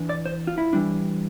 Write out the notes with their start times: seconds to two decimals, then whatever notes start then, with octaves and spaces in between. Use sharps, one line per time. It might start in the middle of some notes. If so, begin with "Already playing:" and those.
Already playing: E3 D4
0.09 D5
0.25 C5
0.47 F4
0.58 E4
0.73 E3 G3 D4